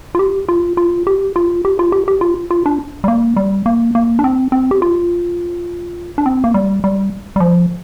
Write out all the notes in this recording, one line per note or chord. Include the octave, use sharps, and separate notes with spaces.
F4
G4
F4
F4
G4
F4
G4
F4
G4
G4
F4
F4
D4
G3
A#3
G3
A#3
A#3
D4
C4
C4
G4
F4
D4
C4
A#3
G3
G3
G3
F3